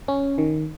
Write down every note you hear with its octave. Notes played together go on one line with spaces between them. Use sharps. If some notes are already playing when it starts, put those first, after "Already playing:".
C#4
D#3